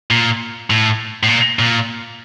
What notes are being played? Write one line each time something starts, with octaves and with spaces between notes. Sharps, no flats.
A#2
A2
A2
A#2
A#2